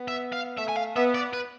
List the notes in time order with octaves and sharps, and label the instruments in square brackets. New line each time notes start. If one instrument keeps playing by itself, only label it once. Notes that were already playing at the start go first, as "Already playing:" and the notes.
Already playing: [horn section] B3
[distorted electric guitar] E5
F5
[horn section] A3 [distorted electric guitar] E5
[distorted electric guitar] G#5
F5
[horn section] B3 [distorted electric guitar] E5
[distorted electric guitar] D5
B4